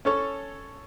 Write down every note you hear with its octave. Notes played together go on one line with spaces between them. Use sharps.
C#4 A4 C#5